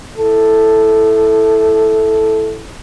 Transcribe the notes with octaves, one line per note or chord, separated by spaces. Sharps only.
E4 A4